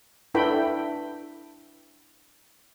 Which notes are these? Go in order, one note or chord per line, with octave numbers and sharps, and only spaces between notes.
D4 E4 A4 B4 G5 B5